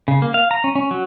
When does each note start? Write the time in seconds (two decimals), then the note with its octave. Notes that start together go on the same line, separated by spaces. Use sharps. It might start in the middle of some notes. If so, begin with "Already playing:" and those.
0.08 C#3
0.22 A#3
0.34 F5
0.51 A#5
0.64 C#4
0.75 C#4
0.91 F#3